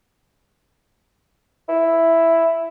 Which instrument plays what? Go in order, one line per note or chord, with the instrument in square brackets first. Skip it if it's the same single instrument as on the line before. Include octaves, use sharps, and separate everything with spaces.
[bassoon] E4